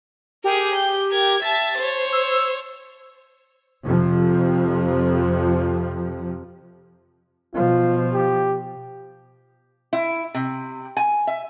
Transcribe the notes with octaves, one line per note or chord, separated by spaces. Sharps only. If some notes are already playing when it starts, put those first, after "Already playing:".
G4 G#4 A#4
G6
A#4 G#6
E5 A5 A6
C5 C#5
E6
F2 C3 F3
B2 F3 F4
G4
E4
C3
G#5
E5